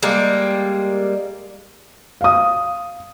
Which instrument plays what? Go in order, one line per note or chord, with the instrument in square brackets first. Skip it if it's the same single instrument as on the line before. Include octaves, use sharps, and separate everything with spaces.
[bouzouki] G3 G#3 A#3
[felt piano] F5 D#6